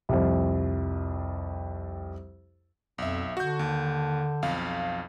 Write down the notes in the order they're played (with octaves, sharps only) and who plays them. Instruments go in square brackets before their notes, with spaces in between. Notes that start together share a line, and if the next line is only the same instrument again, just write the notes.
[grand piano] C2 F2
[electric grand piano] B1 E5 [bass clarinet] F2
[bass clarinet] D3 [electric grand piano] F#4 G6
[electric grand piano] D#2
B1 F2 F5